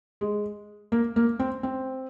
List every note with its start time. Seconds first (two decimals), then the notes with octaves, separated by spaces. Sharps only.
0.21 G#3
0.92 A#3
1.16 A#3
1.39 C4
1.63 C4